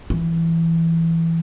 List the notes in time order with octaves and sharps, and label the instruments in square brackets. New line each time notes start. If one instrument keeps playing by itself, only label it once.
[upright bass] E3